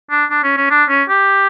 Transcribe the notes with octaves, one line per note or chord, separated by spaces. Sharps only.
D4
D4
C#4
C#4
D4
C#4
G4